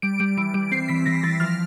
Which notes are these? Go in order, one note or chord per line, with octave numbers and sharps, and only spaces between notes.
G3 D7
G3 D7
E3 D7
G3 D7
C4 C7
E3 B6
E3 A#6
E3 A6
F3 F6